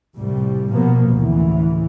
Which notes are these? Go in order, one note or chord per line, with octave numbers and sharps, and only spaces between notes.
C2 A2 G3
B2 F3 A#3 B3
A1 D2 C#3 E3